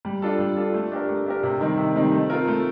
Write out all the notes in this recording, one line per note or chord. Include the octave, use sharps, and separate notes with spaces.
G3
D4 F4 A4
G3
D4 F4 A4
A3
D4 G4 A#4
A3
D4 G4 A#4
C3
D#3 G3 C4 D#4
C3
D#3 G3 C4 D#4
A3
C4 F4 A#4
A3